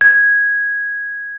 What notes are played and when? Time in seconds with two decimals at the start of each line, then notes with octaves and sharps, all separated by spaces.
0.01 G#6